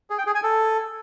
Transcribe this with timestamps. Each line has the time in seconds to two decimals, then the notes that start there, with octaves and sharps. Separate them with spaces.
0.10 G#4
0.18 G5
0.27 G#4
0.35 G#5
0.43 A4